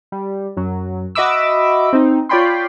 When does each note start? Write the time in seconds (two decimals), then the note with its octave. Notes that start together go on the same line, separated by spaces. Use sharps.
0.12 G3
0.57 F#2 F#3
1.15 F#4 D#5 E5 B5 D6 E6
1.93 C4 D#4
2.29 F4 C#5 D5 G5 B5 C6